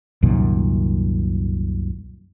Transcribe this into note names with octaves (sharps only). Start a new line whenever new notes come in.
C2 F#2 A#2 D#3